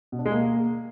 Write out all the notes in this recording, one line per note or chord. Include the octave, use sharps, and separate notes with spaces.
B2
D4
G#3
A#3